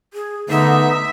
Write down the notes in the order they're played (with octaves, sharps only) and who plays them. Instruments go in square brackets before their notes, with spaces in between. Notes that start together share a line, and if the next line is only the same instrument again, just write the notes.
[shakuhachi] G#4
[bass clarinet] D3 [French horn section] A3 B3 [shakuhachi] D#4 [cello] E5